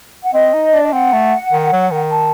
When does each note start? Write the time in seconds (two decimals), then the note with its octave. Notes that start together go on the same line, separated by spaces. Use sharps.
0.24 F#5
0.34 C4 D#5
0.54 D#4
0.71 D4 D5
0.82 D#5
0.93 C4 F#5
1.13 A3
1.52 D#3
1.72 F#3
1.91 D#3
2.11 A5